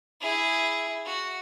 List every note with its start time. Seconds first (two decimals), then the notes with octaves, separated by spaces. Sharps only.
0.21 E4 G#4
1.06 F#4